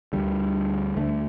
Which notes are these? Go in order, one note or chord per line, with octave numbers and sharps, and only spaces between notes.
D2 D3 G3
D2 D3 A3